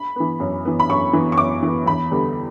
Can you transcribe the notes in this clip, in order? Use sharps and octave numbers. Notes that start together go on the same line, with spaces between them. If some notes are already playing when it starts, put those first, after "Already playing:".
Already playing: B5
E3 B3
F#2
E3 B3
B5
F#2 C#6
E3 B3
C#6
F#2 D6
E3 B3
E2 B5
D3 G3 B3